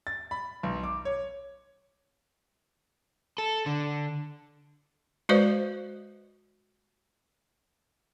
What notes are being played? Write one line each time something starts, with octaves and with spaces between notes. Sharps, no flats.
A6
B5
B1
D6
C#5
A4
D3
G#3 F#4 B4 C5 D5 F5